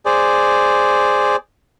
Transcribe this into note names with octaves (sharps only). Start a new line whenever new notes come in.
G#4 C5 D5